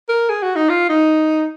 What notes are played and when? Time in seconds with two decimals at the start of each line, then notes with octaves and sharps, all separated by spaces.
0.09 A#4
0.29 G#4
0.43 F#4
0.56 D#4
0.69 F4
0.89 D#4